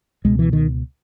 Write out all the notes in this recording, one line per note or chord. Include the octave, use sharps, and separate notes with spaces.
C#2 B2 G#3
E3
D#3